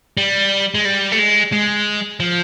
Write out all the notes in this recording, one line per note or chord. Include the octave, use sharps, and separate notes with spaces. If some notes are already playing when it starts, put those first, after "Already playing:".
G3
G#3
G3
A3
G#3
G#3
F3